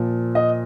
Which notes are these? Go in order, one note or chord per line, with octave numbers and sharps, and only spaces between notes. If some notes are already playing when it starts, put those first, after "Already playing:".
Already playing: A#2 F3
D#5